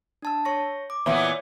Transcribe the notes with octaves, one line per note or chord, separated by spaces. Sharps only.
D4 A5 E6
C#5 C#6 A#6
D6
A#2 E3 B3 C#5